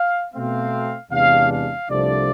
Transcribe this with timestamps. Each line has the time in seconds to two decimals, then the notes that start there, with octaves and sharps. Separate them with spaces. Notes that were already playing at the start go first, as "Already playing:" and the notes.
Already playing: F5
0.34 B2 A3 C4 F5
1.11 E2 C3 G#3 D4 F5
1.50 F5
1.89 C2 C3 F3 A3 D4 D5